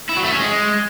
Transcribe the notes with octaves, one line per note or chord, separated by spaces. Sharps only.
E4
F#3
A3
C#4
G#3